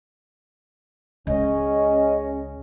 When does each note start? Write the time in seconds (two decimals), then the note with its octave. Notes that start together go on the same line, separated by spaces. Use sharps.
1.27 C#2 C#3 C#4 D#5